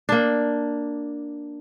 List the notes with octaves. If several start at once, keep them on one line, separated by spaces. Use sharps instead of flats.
A#3 D4